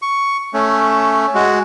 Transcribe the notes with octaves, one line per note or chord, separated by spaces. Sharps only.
C#6
A3 C#4
G#3 F#4